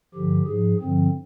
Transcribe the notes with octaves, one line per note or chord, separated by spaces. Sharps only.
G2 D3 F3 G4
G#2 F3 G#4
G2 D3 F3 C4